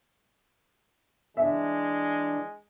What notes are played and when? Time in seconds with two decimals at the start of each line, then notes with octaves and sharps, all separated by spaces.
1.37 E3 G#3 D4 E5